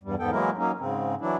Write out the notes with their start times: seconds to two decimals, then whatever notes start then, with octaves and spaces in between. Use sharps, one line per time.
0.03 E2 G2 G3
0.19 E2 G#2 B3 A4 G5
0.31 E3 F#3 G#3 A#3 E4 A#4
0.58 F#3 A#3 C#4 D#4
0.80 G#2 C#3 C4
1.21 E3 F#3 D4 E4